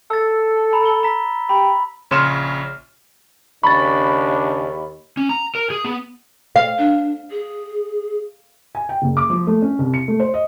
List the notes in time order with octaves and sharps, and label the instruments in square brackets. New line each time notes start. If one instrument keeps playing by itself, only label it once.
[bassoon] A4 [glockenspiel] E6 A6
[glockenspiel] A#5 B5
G7
A#5 B6
[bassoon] G4 [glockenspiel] B5
[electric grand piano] A#1 C#3 C#5 C6 F6 E7
[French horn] D#2 [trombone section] C#3 D4 [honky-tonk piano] B5 [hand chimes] C#6 A6
[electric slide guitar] C#4
A#5
A#4
G#4
B3
[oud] F5
[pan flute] D4
G#4
[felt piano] G#5
G5
F#1
D6
F3
A3
C#4
C2
C#7
A3
C5
D#5